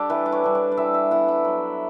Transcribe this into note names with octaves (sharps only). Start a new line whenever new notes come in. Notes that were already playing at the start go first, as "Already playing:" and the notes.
Already playing: G3 D4 G4 A4 D5
E3 B4
D5
C#5
G3 D4
D5
D5
E3 E5
E5
B3 E4 F#5
E5
F#3